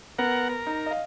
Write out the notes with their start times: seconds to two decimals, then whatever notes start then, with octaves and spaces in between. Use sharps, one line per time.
0.19 B3 A#4 F#5
0.49 A#4
0.67 D#4
0.86 D#5 F5